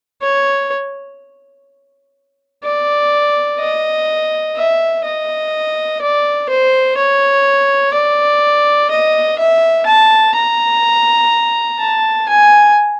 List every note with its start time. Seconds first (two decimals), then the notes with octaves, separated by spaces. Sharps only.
0.22 C#5
2.64 D5
3.60 D#5
4.56 E5
5.04 D#5
6.01 D5
6.49 C5
6.97 C#5
7.94 D5
8.91 D#5
9.39 E5
9.86 A5
10.35 A#5
11.79 A5
12.28 G#5